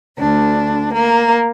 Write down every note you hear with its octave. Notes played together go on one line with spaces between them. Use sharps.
D2 D3 D4
A#3